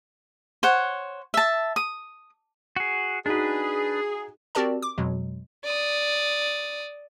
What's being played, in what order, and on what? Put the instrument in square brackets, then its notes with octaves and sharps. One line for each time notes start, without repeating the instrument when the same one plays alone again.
[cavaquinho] C5 C#5 F#5
E5 A5
D#6
[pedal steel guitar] F#4 G#4
[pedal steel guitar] D4 B4 [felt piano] D#4 F#4 [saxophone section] G#4
[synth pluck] C4 F#4 G4 A#4 D5 A5
D6
F2 B2 F#3 G#3
[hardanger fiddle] D5 D#6